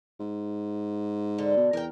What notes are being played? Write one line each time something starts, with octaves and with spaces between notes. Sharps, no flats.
G#2
D3
B2
E2 A#4 G5